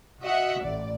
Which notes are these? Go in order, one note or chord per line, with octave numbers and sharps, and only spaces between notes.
F#4 D#5 E5 F#5
A1 D5